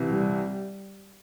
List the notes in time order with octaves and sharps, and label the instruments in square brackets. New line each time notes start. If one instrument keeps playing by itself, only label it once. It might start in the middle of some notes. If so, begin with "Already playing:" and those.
Already playing: [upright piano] C2 C3 E3
[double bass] G3